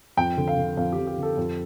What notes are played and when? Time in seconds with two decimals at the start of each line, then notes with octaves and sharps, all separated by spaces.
0.17 F2 G5
0.37 D3
0.48 F5
0.57 D3
0.77 F2 F5
0.93 G4
0.97 F2
1.07 G4
1.18 D3 A4
1.37 F2